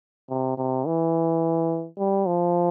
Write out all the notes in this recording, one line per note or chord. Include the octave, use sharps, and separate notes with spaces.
C3
C3
E3
G3
F3